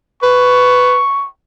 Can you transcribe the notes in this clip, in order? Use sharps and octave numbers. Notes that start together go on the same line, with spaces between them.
B4 C#6